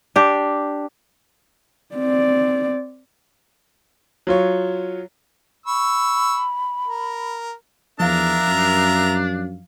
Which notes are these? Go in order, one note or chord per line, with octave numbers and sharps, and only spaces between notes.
D4 G4
C4 D5
F#3 F4 C#5
B5 C#6 E6
A#4
E2 F3 D4 A#4 E5 F5 A#5
F#2